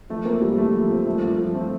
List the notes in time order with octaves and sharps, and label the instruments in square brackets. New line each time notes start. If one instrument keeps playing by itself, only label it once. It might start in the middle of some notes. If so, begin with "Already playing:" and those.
[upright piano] F3 [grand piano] A3
[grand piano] A#3 [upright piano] C4
[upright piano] G2 [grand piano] G3
[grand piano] A3 [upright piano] F4
[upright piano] F3
C4
[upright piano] G2 [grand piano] A3
[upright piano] F4
F3
[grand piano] A3 [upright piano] C4